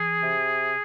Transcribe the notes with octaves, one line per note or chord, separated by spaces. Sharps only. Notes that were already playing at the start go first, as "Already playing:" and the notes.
Already playing: E3 G#4
C3